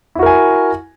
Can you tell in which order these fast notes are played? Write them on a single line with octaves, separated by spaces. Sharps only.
E4 F#4 A#4 G#5